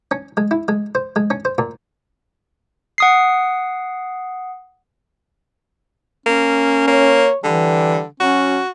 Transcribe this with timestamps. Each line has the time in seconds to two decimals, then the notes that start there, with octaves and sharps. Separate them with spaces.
0.11 C#4
0.37 G#3
0.51 E4
0.68 G#3
0.95 C5
1.16 G#3
1.30 C#4
1.45 C5
1.58 A#2
2.98 F#5 D#6 C7
6.26 A#3 C#4
6.88 A#3 C#5
7.44 D3 E3 G3
8.20 F#3 C#4 F#4